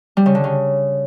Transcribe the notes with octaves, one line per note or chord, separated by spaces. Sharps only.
G3
C#3
D3
C#3